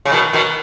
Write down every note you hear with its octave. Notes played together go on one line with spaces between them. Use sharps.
C#3
B2 D#3
B2 D#3